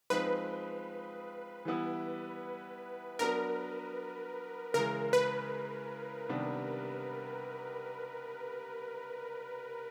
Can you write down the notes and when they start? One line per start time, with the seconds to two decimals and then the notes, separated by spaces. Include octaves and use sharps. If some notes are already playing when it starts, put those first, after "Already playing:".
0.10 F3 G#3 C4 D#4 B4
1.65 E3 G3 B3 E4
3.19 F#3 B3 D4 A#4
4.74 C#3 E3 G#3 A#4
5.13 B4
6.29 C3 D#3 G3 B3 D4